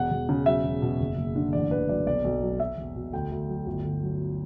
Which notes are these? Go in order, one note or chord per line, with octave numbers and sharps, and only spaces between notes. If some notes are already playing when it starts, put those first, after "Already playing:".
Already playing: E1 F#5
E1
C#3
F#3 E5
E1
B2
F#1
F#1
D3
A1 D5
A1 B4
F#3 D5
B1 D5
B1
F#3
F#3 E5
E1
B2
D2 G5
D2
F#3
G1
G1
F#3